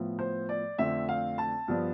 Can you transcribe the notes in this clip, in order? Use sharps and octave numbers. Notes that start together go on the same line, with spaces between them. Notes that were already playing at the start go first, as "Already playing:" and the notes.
Already playing: A2 F3 B3
C5
D5
F2 D3 A3 C4 E5
F5
A5
G2 F3 B3